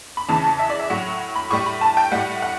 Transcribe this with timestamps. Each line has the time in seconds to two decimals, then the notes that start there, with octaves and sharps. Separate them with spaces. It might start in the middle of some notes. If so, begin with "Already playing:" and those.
0.17 B5
0.29 E2 C#3 E3 A5
0.44 A5
0.59 E5
0.70 D5
0.79 E5
0.90 A2 F#3 F#5
1.36 B5
1.51 A2 G3 C#6
1.66 B5
1.81 A5
1.97 G5
2.12 A2 G3 F#5
2.42 F#5